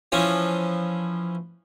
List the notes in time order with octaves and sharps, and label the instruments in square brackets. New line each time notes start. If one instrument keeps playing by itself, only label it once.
[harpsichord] E3 F3 C#4